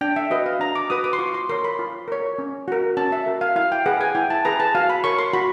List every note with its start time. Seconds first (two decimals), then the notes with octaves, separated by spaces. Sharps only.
0.01 D4 G5
0.16 E5
0.31 F#4 B4 D#5
0.46 F5
0.60 D4 A#5
0.76 D6
0.90 F#4 B4 D#6
1.04 D6
1.13 C6
1.19 F4 C#6
1.34 C6
1.49 A#4 C#5 C6
1.64 B5
1.79 F4
2.08 A#4 C#5
2.38 C#4
2.68 F#4 A#4
2.97 C#4 A5
3.12 E5
3.26 F#4 A#4
3.41 F5
3.56 E4 F5
3.72 G5
3.86 G#4 B4 F#5
4.01 G#5
4.15 E4 G5
4.30 A5
4.45 G#4 B4 A#5
4.60 A5
4.75 F#4 F5
4.90 B5
5.04 A#4 C#5 C#6
5.19 C6
5.33 F#4 B5